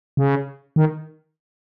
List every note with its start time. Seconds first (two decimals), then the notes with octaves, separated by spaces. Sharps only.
0.17 C#3
0.76 D#3